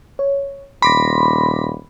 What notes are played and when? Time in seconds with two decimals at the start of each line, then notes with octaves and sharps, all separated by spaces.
0.19 C#5
0.82 D#1 B5 C6 D6 A#6